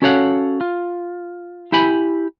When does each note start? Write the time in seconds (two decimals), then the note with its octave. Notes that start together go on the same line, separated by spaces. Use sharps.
0.02 C#4 F#4 A4 C#5 F5 F#5
0.61 F4
1.72 E4 G4 G#5 B5